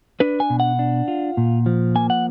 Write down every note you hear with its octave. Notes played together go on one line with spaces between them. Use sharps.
D4 B4
G#5
B2
F#5
D4
F4
A#2
F3
A#3 G#5
F#5